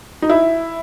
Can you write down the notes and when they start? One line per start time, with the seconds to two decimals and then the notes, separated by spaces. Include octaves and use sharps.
0.22 D#4
0.30 E4